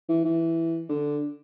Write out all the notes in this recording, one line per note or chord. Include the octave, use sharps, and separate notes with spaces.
E3
E3
D3